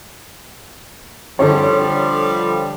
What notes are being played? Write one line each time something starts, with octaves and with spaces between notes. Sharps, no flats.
D3 F3 G3 D4 C#5